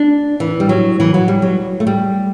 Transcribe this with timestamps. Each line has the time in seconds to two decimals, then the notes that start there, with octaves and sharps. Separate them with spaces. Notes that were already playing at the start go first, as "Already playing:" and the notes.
Already playing: D4
0.40 E3
0.60 G3
0.69 F#3
1.00 E3
1.14 F#3
1.28 G3
1.42 F#3
1.80 A3
1.87 G3